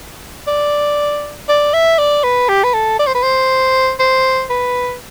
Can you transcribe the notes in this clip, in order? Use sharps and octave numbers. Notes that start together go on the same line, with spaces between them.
D5
D5
E5
D5
B4
G4
B4
A4
D5
C5
B4
C5
C5
B4